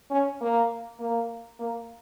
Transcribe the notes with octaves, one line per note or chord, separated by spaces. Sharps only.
C#4
A#3
A#3
A#3